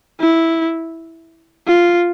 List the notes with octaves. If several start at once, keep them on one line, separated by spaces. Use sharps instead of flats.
E4
F4